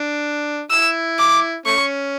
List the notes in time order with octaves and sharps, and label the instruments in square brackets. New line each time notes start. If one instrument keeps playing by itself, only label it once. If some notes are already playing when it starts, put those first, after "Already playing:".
Already playing: [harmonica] D4
[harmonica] E4 [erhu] E6
[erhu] D6
[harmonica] A3 C#4 [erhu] C#6